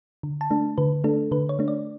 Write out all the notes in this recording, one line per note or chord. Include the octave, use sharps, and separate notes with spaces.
D3
A5
A3 D4
D3 B4
A3 D4 A4
D3 B4
C#5
A3 D4
D5